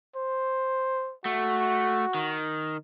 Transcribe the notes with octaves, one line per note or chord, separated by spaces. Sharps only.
C5
A3 F#4
D#3